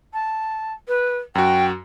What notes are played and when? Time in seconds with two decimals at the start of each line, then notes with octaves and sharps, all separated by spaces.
0.14 A5
0.88 B4
1.35 F#2 F#4 G5